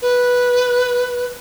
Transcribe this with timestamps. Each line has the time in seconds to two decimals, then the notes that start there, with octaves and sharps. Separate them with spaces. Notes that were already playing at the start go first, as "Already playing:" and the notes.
0.02 B4